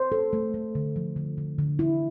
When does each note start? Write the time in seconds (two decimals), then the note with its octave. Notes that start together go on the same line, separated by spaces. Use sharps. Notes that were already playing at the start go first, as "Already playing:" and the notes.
Already playing: C5
0.12 A4
0.33 A3
0.54 A3
0.75 D3
0.96 F3
1.16 D3
1.38 D3
1.59 D3
1.79 E4